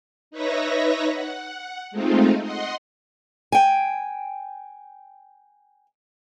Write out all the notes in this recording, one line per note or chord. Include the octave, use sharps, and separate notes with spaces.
D#4 B4 C#5 E5 A#6
F#5
G#3 A3 C4 D#4 F4
D#5 F#5 C6
G5 G#5